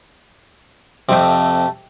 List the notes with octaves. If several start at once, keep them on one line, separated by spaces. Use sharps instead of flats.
F2 C3 A3 C4